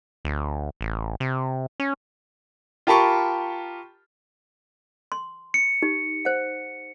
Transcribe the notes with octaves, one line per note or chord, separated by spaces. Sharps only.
D2
A1
C3
C#4
F4 G4 A#4 A5 B5 C#6
C6
C#7
D#4 G4
C5 F#5